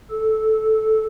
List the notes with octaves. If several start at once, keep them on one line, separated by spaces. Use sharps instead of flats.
A4